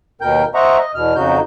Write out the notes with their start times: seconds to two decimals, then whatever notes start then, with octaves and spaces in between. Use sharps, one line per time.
0.21 D#2 B2 A#4 G5 G6
0.54 C5 D#5 E5 F#5 A#5 C#6
0.78 D#5
0.95 E2 B2 F6
1.16 F2 C#3 F#3 D#4 F#4 G6